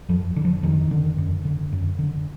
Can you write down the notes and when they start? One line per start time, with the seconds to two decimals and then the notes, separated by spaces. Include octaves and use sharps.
0.09 F2 F3
0.36 D3
0.45 F3
0.63 F2 D#3
0.91 D3
1.18 F#2
1.45 D3
1.72 F#2
1.99 D3